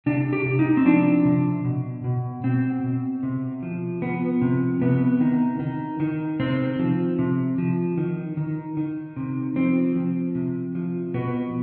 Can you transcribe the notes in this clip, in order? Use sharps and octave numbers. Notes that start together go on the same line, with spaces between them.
C3 D4
G4
C3
D#4
C4
F3 D4
C3
B2
B2
B2 C4
B2
C3
F3
F3 B3
C3
C3 B3
D#3
D#3
D#3
C3 C4
F3
C3
F3
D#3
D#3
D#3
C3
F3 C4
F3
C3
F3
B2 B3